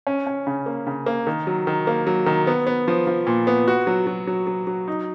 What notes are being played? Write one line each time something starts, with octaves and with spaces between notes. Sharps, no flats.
C#4
C#4
C#3
A#3
C#3
A#3
D#3
F#3
D#3
A#3
F#3
D#3
B3
B3
F3
F3
A#2
B3
F#4
F#3
F#3
F#3
F#3
F#3
D#4